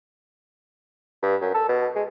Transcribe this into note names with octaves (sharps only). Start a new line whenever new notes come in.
G2
F#2
A4
B2
G#3